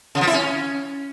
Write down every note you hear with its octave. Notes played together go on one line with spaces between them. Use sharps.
C#3
F3
E4
C#4